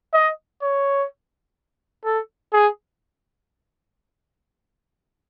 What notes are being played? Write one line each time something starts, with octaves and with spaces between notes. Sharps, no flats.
D#5
C#5
A4
G#4